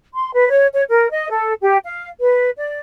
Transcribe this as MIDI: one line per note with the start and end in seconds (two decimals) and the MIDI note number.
0.14 0.30 84
0.33 0.48 71
0.50 0.66 73
0.73 0.83 73
0.89 1.10 70
1.11 1.28 75
1.30 1.54 69
1.61 1.76 67
1.84 2.08 77
2.20 2.50 71
2.56 2.80 74